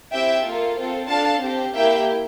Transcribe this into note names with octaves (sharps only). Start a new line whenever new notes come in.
C4 E4 G4 E5 G5
A#3 F4 A4
C4 F4 A4
D4 A4 F5 A5
C4 G4
A#3 E4 G4 E5 G5